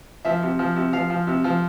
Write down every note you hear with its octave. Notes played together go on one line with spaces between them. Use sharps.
F3 E5
C3
F3
C3
F3 F5
F3
C3
F3